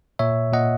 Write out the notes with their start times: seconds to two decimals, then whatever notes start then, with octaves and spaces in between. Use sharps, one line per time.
0.19 A#2 C#5 E5
0.52 A#2 D#5 F#5